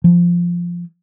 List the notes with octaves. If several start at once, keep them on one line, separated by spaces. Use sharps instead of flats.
F3